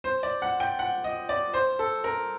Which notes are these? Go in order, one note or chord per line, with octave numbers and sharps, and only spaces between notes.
C5
D5
F#5
G5
F#5
D#5
D5
C5
A4
A#4